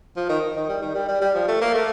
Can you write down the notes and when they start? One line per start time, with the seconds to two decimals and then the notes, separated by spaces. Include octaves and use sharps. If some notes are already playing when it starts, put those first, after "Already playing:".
0.17 F3
0.29 D#3
0.56 D#3
0.69 G3
0.82 D#3
0.95 G3
1.09 G3
1.22 G3
1.35 F3
1.48 A3
1.61 A#3
1.75 A3